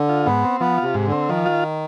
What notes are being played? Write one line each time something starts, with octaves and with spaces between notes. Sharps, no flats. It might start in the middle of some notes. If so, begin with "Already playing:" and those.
Already playing: D3
F4
G#2 B3
C4
F3 B3
C3 F4
G#2
D3
C4
D#3 F3
F4